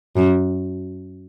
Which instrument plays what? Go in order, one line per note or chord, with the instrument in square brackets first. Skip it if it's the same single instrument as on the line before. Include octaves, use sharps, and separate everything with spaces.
[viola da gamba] F#2